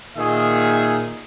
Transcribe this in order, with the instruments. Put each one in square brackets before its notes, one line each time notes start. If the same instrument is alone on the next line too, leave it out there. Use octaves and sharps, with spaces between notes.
[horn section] A#2 D#3 G#4 E5